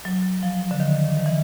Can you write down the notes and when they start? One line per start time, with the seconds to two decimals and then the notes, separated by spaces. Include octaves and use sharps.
0.05 F#3
0.43 F3
0.71 D3
0.80 D#3
1.17 D#3
1.26 E3